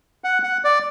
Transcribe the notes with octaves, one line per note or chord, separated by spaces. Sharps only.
F#5
F#5
D5